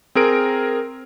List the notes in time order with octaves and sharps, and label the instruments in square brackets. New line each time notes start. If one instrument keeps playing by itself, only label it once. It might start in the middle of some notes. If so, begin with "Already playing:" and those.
[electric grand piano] C4 G#4 A#4 D7